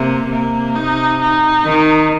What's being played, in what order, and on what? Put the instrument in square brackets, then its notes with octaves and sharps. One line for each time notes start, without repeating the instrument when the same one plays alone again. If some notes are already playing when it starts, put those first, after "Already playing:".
Already playing: [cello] C3 [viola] A#3
[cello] C3 [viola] A#3
[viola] D#4
D#4
[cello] D#3